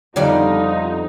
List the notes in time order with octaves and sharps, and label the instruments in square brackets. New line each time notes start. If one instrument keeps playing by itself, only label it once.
[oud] F2 G3 D5 [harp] D3 B3 C4 [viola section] D#4 [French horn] F4